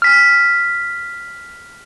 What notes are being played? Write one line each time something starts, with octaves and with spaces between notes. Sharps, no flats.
F6 B6